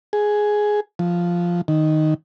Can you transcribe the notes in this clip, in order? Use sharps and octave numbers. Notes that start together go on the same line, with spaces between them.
G#4
F3
D#3